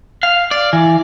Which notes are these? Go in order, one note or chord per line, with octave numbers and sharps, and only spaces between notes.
F5
D5
E3